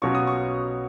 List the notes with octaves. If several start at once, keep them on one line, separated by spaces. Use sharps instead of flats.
B2 F#3 C#4 F4 C#6
D#6
C#6